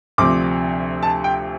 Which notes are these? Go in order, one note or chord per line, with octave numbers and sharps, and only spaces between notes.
D2 C3 F3 C4 D6
A5
G5